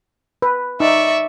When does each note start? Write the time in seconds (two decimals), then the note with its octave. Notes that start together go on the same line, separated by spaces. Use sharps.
0.42 B4
0.80 D#4 D5 E5 C#6